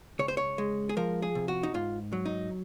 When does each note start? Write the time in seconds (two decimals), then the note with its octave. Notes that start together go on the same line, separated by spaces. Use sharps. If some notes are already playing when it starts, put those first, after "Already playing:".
0.19 C#2 C#5
0.28 C5
0.37 C#5
0.58 G#3
0.89 G#4
0.97 F3 A#4
1.22 G#4
1.35 C3
1.48 F#4
1.63 D#4
1.74 G#2 F4
2.13 F#3
2.25 D#4